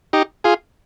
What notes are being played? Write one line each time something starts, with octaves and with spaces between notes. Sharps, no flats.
D#4 G4
F4 G#4